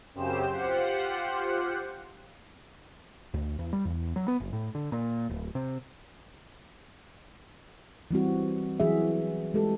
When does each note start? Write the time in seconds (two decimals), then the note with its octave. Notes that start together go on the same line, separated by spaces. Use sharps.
0.14 F#2 C#3 C4 G4 C5 E7
0.52 F4 G4 C5 F#5
3.34 D2
3.59 E2
3.73 G3
3.85 E2
4.16 F#3
4.28 B3
4.40 F#1
4.53 A2
4.75 D3
4.92 A#2
5.29 D1
5.55 C3
8.11 E3 G3 C4 F#4
8.80 E3 F#3 F#4 G#4 E5
9.54 G#3 G4 A4